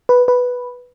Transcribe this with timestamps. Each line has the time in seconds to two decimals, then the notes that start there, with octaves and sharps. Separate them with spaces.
0.09 B4
0.28 B4